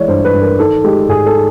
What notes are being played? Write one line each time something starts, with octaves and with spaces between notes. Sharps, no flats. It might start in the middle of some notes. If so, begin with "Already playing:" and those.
Already playing: E3 G#3 C#5 D5
G2 C5
B4
G2
A#4
D#3 A4
G#3 G4
G#2 G#4
A4